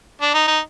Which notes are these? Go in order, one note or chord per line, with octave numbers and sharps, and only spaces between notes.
D4
D#4
D#4